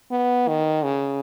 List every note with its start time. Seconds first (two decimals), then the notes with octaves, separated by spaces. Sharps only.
0.11 B3
0.48 D#3
0.84 C#3